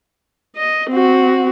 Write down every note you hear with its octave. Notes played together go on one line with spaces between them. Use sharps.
D#5
C4 F#4